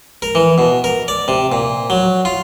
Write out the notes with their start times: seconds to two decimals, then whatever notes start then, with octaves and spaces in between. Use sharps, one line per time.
0.22 A#4
0.35 E3
0.58 B2
0.84 A#4
1.08 D5
1.28 C3
1.52 A#2
1.90 F#3
2.25 F4